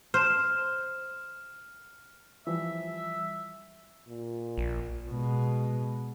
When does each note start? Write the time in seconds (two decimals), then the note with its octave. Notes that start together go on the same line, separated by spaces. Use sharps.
0.14 C5 F6 E7
2.47 E3 F3 G3 E5
4.08 A#2
4.58 A#1
5.09 B2 G#3